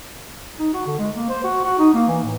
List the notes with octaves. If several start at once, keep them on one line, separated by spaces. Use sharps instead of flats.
D#4
F#4
D3
G#3
A#3
C5
F#4
F#4
D#4
A#3
E3
A2